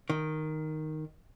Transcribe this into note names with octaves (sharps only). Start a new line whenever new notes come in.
D#3